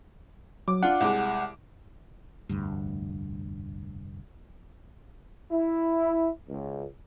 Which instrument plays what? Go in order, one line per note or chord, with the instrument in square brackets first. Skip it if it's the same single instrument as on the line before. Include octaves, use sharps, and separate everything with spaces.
[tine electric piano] F#3 [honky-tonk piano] D6
[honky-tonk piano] D4 F4 [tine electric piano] F#5
[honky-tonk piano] C2 G#3 D6
[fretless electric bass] F1 D2 G2
[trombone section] E4
C#2